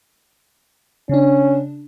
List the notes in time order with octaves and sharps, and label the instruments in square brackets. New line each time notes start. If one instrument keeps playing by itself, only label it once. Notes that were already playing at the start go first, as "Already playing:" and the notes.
[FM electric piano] C#3 D4 [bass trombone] C#4